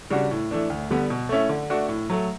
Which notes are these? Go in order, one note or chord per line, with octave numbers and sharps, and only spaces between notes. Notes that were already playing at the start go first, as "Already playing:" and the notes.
C#3 G3 D4 F#4
A2
E3 A3 D4
D2
D3 G3 B3
B2
A3 C#4 E4
D3
A3 D4 F#4
A2
F#3 A3